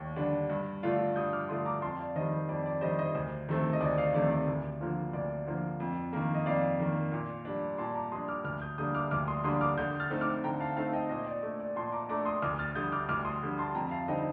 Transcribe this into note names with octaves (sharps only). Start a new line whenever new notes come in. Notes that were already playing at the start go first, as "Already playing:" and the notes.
Already playing: D#2 D4
D3 G3 D4
G2
D3 A3 D4 F4
G2 D#6 G6
D6 F6
D3 A3 D4 F4 C6 D#6
A#5 D6
F2 A5 C6
D5 F5
D#3 G3 C5 D#5
C5
F2 D5
D5
D#3 G3 C5 D#5
C5 D#5
D2 C5
C3 D#3 A3 C4
D#5
D2 D5
D5 F5
C3 D#3 A3 C4 D5
D5
D2
D3 F3 A#3 F4
D2 D5
D3 F3 A#3 F4
F2
D#3 A#3
D#5
F2 D5 F5
D#3 A#3
A#2
G3 D4
A#2 A5 C6
A#5 D6
G3 D4 C6 D#6
D6 F6
D2 D6 F6
D#6 G6
D3 G3 A#3 D4 D#6 G6
D6 F6
D2 D6 F6
C6 D#6
D3 G3 A#3 D4 C6 D#6
D6 F6
D3 D#6 G6
F6 A6
A3 C4 D#4
D6 F6
D3 G5 A#5
F5 A5
A3 C4 D#4 F5 A5
D#5 G5
A#2 C5 D#5
D5
A3 D4
D5
A#2 A5 C6
A#5 D6
A3 D4 A#5 D6
C6 D#6
D2 D6 F6
F6 A6
D3 G3 D#6 G6
D6 F6
D2 D6 F6
C6 D#6
D3 G3
A5 C6
F2 G5 A#5
F5 A5
D3 G3 C4 D#4 D#5 G5